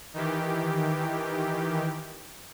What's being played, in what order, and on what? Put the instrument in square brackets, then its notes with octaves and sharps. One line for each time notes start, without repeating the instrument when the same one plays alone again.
[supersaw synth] D#3 E3 G4